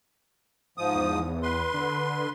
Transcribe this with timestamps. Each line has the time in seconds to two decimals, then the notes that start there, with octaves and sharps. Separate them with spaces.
0.78 G#2 F3 D#6
0.95 E2
1.43 B4 C6
1.73 D3